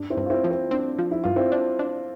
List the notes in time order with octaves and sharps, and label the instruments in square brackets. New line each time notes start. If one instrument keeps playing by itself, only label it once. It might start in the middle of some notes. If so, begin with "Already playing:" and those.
Already playing: [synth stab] G2 [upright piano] D4
[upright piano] C4 E4
[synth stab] G2
[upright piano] F4
C4 E4
[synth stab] F3
[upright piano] C4
[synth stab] C4 [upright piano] D4
[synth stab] F3
[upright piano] E4
[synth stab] G2 [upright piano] F4
[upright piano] C4 E4
[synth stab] D4
D4